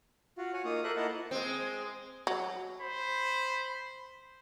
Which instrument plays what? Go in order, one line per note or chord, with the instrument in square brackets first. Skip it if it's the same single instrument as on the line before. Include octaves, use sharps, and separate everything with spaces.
[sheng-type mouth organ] F4 F#4
F#4 C#5 G#5
A#3 D#4 F4 D#6
A4 A#4 C5 E5 F#6
A#3 E4 F4 D#5 F#5 A5
[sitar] G#3 C4
[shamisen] F#3
[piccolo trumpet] C5 [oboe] B5